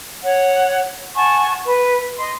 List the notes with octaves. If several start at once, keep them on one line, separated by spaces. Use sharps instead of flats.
C#5 F#5
F#5 G#5 A5 C#6
B4
D#5 C6